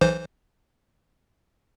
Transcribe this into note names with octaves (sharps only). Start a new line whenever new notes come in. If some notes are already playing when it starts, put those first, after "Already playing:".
B1 E3 C5